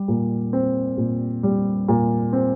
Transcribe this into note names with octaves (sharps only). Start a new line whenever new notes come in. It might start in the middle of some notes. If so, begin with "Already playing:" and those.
Already playing: G3
A#2
C4
A#2
G3
A#2
C4